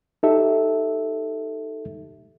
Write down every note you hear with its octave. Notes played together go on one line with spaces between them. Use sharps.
D#4 G4 A4 E5